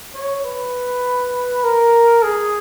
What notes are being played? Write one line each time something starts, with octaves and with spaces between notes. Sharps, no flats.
C#5
B4
A#4
G#4